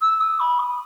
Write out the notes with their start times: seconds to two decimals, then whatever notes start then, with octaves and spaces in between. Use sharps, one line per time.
0.01 E6
0.20 D#6
0.39 B5
0.59 D#6